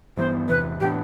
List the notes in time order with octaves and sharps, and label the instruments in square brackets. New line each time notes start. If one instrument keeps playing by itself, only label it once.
[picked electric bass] G2 E3 B3 [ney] C5
[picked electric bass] E2 C3 E3 [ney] B4
[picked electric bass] A2 E3 B3 D4 [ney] G4